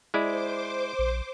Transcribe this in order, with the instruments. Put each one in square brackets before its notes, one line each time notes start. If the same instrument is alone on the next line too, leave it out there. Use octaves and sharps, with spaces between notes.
[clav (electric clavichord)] G#3 E4 D5 [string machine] C5 D6
[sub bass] A#1